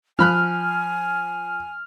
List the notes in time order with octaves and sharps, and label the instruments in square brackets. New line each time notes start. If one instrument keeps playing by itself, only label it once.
[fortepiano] F3 B5 F#6 [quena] G#5 [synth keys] F6